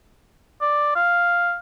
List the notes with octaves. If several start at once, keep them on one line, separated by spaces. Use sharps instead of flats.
D5
F5